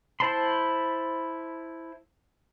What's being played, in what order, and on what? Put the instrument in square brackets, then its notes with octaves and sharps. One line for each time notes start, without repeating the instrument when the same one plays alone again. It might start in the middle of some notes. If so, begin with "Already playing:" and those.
[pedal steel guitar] E4 C5 A5 B5 C6